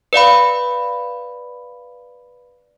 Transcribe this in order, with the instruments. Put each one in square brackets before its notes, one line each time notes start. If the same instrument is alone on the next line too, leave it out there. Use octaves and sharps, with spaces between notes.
[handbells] B4 D5 F5 B5